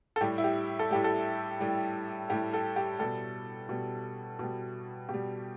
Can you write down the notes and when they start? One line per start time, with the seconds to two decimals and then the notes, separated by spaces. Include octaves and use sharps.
0.16 A4
0.21 A2 G3 G4
0.38 E4
0.44 G4
0.79 A4
0.90 A2 G3 G4
1.04 A4
1.60 A2 G3
2.30 A2 G3 G4
2.54 A4
2.76 G4
2.99 B2 G3 A4
3.69 B2 G3
4.39 B2 G3
5.09 B2 G3 G4